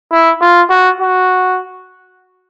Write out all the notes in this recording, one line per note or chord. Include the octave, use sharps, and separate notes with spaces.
E4
F4
F#4
F#4